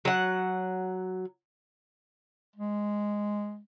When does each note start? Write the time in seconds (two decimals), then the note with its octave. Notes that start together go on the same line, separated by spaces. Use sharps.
0.05 F#3 F#5
2.56 G#3